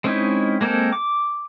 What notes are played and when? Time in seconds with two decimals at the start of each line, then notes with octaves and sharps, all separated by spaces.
0.04 G#3 C4 C#4 D#4 E4
0.61 G#3 A#3 C4 A4 A#4
0.93 D6